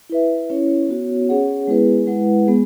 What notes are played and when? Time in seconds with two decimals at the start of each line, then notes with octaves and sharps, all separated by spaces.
0.10 E4 B4 E5
0.50 C#4 E4 C#5
0.89 B3 F#4 C#5
1.29 C#4 G#4 C#5 F#5
1.67 G#3 B3 E4 G#4 B4
2.07 G#3 E4 B4 F#5
2.47 G#3 B3 G#4